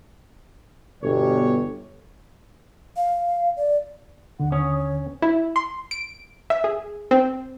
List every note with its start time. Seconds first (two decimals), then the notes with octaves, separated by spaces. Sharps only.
1.03 G1 B2 G4 C#5
2.96 F5
3.57 D5
4.40 D#2 D3 F#5
4.52 C#4 D#6
4.75 C#5
5.22 E4
5.56 C6
5.91 D7
6.50 E5
6.64 G#4
7.11 C4